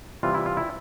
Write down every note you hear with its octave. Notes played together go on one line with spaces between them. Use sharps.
C3 E3 G3 F4
E4
F4
E4